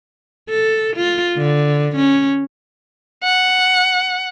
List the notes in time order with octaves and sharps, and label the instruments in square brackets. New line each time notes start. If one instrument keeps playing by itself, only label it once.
[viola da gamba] A4
F4
D3
C#4
[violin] F#5